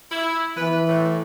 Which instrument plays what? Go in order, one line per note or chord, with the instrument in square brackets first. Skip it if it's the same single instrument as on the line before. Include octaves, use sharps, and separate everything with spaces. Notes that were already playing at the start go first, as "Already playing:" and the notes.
[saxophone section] E4
[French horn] E3 [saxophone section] B3 B4
[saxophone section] A2